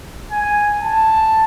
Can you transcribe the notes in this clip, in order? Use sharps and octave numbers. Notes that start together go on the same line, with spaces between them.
G#5
A5